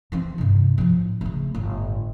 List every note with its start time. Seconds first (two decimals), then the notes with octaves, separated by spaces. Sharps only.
0.12 E3 C4
0.38 G2 C3
0.78 A2 F3
1.21 C#3 A3
1.55 G1 A2